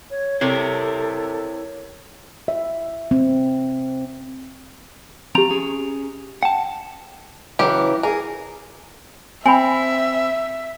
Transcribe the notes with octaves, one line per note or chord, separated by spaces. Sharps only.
C#5
C3 E4 G4 A4 A#4 C#5
E5
C4
F3 C4 G4 A#5 F7
C#4 G#4
F#5 G5 A5
C#3 E3 F#3 G4
G#4 A#4
C4 E5 G#5 B5